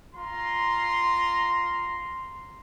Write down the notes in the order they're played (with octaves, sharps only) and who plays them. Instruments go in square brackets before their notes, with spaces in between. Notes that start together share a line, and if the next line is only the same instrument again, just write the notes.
[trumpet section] F4 A#5 C6